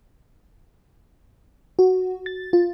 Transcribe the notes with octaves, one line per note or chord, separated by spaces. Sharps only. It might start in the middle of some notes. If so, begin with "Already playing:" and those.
F#4
A6
F4